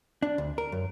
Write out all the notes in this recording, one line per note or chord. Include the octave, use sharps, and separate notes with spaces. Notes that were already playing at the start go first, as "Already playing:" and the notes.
D4
D2
A#4
F#2